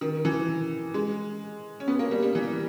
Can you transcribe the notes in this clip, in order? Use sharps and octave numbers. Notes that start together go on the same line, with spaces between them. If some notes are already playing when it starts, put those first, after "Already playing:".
D#3
E3
G#3
C#4
B3
A#3
G3
G3
E3